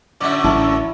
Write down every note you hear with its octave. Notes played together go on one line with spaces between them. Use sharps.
F#2 A2 D3 D5 E5
A1 E4 A4 A#4 C#6